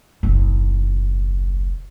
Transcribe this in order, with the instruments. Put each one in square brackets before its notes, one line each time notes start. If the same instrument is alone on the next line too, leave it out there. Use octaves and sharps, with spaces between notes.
[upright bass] F#1 B1